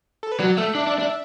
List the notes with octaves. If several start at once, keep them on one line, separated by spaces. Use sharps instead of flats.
A4
B4
F#3 D5
A3 E5
D4
D4
D4